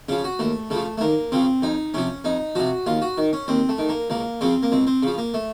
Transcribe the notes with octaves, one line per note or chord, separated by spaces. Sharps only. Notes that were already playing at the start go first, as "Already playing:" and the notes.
C#3 F3 C#4
F#4
D#2 A3
C#3 F3 A3
A3
D#2 A#3
C#3 F3 C4
F2 D#4
C3 F3 C#4
F2 D#4
C3 F3 F#4
D#2 F4
F#4
D#3
C#4
D#2 C4
A3
D#3
A#3
C#2 A#3
C#3 F3 C4
A#3
C#2 C4
C4
C#3 F3
A#3
A3